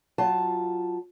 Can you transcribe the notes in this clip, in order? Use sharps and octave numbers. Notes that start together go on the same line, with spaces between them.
F#3 F4 A5